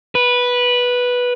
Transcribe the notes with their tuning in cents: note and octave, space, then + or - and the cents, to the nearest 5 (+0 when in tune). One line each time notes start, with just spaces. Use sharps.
B4 -10